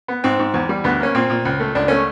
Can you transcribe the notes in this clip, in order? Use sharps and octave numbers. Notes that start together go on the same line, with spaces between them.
B3
G#2 C4
G#2
E2
G3
D2 B3
A#3 C#4
A#2 C4
A#2
C#2
A3
C#2 D4
A3 C#4